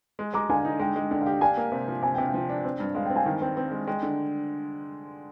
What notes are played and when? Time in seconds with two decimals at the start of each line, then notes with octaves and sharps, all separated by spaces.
0.19 G#3
0.33 G#3 A#5 D6
0.49 D3 F5 G#5
0.65 D#4
0.80 G#3 G5
0.96 G#3
1.11 D3 G5
1.21 F5
1.26 G4 G5
1.41 D4 F5 G#5
1.57 A#3
1.72 C3
1.88 F3
2.02 C3 G#5
2.14 C3 G5
2.25 F5
2.34 F3 G5
2.49 D4
2.65 C4
2.80 G2
2.95 G#3 F5
3.05 G5
3.10 C4
3.15 F5 G#5
3.26 D#3 G5
3.41 C4 G5
3.57 C4
3.71 G#3
3.87 G#3 G5
4.03 D3